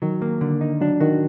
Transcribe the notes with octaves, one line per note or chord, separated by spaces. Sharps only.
D#3 F#3
A#3
D3
D#4
F#3 D4
D#3 F#4